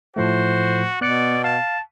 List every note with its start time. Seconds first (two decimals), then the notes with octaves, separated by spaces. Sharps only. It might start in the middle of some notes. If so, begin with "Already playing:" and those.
0.16 A2 F3 A3 F#4 C5
1.01 B2 B3 D5 F#6 C#7
1.44 F5 A5